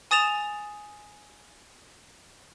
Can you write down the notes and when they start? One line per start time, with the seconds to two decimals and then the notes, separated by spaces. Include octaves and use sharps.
0.11 G#5 D#6 A6 E7 F7